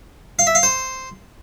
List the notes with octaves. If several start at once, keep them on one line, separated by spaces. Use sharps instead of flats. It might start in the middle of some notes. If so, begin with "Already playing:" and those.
F5
E5
F5
C5